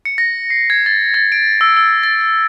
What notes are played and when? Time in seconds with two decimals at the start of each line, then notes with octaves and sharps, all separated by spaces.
0.05 C#7
0.18 A#6
0.50 C7
0.70 G#6
0.86 A6
1.14 A6
1.32 D7
1.61 E6
1.77 E6
2.03 A6
2.21 A6